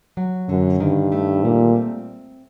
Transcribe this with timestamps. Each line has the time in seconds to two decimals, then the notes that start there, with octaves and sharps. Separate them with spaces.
0.17 F#3
0.49 F#2 D3
0.80 G2 D#3
1.12 A3
1.44 A#2 G3
1.76 C4